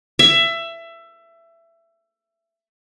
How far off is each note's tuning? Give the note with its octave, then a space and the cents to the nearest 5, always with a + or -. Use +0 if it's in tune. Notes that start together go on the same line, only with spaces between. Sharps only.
E5 +20